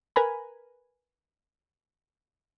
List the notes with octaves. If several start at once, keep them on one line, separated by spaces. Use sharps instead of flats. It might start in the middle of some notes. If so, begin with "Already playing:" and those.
A#4 B4 G#5 A#5 B5